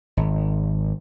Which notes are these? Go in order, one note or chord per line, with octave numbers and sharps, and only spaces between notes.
G#1